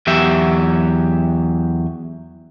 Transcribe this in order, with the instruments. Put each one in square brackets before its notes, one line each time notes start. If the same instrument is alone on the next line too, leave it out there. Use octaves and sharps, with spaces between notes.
[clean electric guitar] E2 F#3 G4 E5